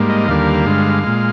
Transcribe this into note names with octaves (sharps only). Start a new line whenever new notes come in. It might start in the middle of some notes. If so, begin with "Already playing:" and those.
Already playing: G#2 G3 A#3
D#5
D#2 D3 G3 A#3 F5
G2 D3 G#3
A#2 G#3